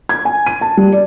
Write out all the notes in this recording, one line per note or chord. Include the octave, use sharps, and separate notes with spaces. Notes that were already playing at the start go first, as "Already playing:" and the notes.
G#6
G#5
D#7
A5
G3
D5